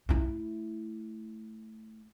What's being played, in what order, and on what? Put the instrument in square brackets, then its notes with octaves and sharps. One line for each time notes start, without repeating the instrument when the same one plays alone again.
[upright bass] A3 E4